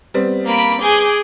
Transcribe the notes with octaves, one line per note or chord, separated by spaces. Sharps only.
G3 B3 C4
A#3 B5 D7
G#4 D6 G6